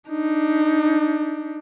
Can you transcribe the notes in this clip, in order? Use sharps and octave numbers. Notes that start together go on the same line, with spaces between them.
D4 D#4